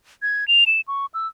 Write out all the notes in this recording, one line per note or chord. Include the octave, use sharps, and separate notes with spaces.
G#6
F7
E7
C#6
E6